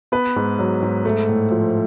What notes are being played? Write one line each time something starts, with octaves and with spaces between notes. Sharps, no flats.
B3 B4
G#2
F#3
G#2
A3
A2
F3